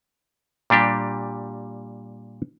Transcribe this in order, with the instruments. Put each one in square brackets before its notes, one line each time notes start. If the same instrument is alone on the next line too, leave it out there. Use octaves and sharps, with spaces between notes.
[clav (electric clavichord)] A#2 G3 D4 G4